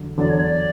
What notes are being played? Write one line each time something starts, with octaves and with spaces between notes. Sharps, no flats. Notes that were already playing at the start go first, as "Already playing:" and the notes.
Already playing: E2 D3 F#3
E2 D3 F#3 D5
C#5
D5